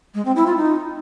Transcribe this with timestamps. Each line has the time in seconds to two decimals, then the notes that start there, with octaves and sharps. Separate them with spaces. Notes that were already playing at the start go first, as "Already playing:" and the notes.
0.14 G#3
0.25 C4
0.36 E4
0.46 F4
0.57 D#4